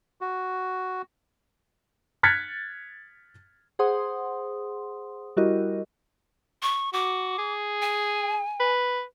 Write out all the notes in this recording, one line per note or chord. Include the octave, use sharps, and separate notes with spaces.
F#4
F6 F#6 G#6 A6 B6 C#7
G#4 C5 F#5 C6 D#6
G3 E4 F#4 G4 A#4 D#5
C#6
F#4 D6
G#4
G#5
B4